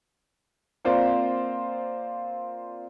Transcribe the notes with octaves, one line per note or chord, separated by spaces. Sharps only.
A#3 C4 F4 C5 D5